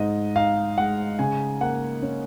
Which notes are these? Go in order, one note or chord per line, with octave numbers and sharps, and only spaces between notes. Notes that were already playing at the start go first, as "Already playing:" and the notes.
Already playing: G#2 D#4 D#5
D#4 F5
G#3 F#5
C#3 G#5
A#3 F#5
C#4